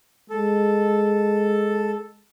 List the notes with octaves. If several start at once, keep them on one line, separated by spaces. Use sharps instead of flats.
G#3 A4